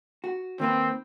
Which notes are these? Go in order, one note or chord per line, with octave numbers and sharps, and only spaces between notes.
F#4
D#3 A#3 C4 B4